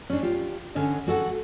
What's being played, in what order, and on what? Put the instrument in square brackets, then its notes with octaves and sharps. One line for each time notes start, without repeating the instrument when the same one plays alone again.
[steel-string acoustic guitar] C#4 D4
F4 G4
D3 C#4 C#5 D#5
G#3 F#4 A4 F#5